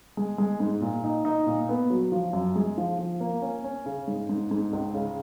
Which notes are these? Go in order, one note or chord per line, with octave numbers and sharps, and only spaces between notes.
G#3
G#3
G#2
A#2
D#4
D#4
A#2
B3
F#3
F3
F#2
G#3
F3
F3
A#3
C#4
C#4
C#3
G#2
G#2
G#2
C#2
C#3